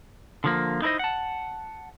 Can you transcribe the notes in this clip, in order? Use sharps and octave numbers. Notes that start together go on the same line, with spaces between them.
D3 F3 A#3
D#4 E4 A#4 C5 D#5
F#5 A5